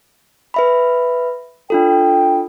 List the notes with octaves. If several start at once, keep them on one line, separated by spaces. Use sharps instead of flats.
B4 E5 B5
D4 F4 A4 G5